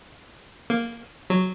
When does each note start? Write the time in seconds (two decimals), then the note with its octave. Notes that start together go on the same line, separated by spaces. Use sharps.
0.70 A#3
1.30 F#3